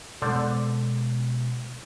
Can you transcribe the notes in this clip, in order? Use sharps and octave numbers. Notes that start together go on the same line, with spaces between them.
B2 D3 G#3 B3 C5 D5